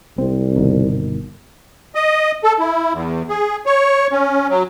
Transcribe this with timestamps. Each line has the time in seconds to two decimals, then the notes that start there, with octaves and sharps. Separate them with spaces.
0.18 C2 C4
0.56 G1 B2 D#3
1.95 D#5
2.44 A4
2.59 E4
2.93 E2
3.29 G#4
3.66 C#5
4.12 C#4
4.49 F#3